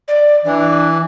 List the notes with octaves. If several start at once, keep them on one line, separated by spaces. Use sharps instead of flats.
D5
E3 D4